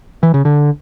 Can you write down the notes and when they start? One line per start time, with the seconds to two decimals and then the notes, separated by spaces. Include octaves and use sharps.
0.23 E3
0.34 C#3
0.45 D3